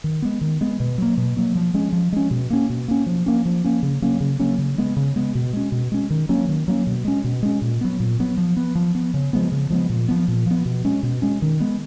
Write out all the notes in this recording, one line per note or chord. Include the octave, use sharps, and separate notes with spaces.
D#3
G#3 B3
D#3
G#3 B3
B2
F#3 A#3
B2
F#3 A#3
F3
G#3 C#4
F3
G#3 C#4
B2
A#3 C#4
B2
A#3 C#4
F3
A#3 C#4
F3
A#3 C#4
C#3
F#3 A#3 C#4
C#3
F#3 A#3 C#4
C#3
G#3 B3
C#3
G#3 B3
B2
G#3 C#4
B2
G#3 C#4
D#3
F#3 A#3 C#4
D#3
F#3 A#3 C#4
B2
G#3 C#4
B2
G#3 C#4
A#2
F#3 B3
A#2
F#3 B3
F3
B3
F3
B3
C#3
F3 G#3 B3
C#3
F3 G#3 B3
A#2
F3 B3
A#2
F3 B3
B2
G#3 C#4
B2
G#3 C#4
D#3
G#3 B3